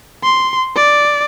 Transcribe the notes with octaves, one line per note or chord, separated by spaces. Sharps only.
C6
D5